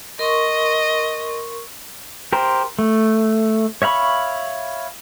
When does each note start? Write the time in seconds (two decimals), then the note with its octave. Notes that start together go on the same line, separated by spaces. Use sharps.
0.19 A#4 D#5 C6 C#6
2.32 G4 A#4 C5
2.79 A3
3.82 C#5 E5 F5 B5 C#6